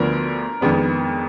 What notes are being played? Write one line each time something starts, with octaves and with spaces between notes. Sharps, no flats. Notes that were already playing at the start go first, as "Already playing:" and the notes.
Already playing: D2 D3 F3 B3 D4 A#4
F2 D#3 G#3 B3 D4